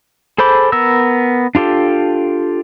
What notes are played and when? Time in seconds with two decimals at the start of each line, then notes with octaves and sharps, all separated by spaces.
0.38 G#4 A4 C5 B5 D6
0.72 B3 A#4 E6
1.55 D4 F4 G4 A4